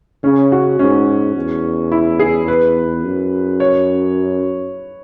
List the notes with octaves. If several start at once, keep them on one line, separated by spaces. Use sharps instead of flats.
C#3 C#4
F#4
G#2 C#4
E2
E4
G#4
B4
F#2
C#5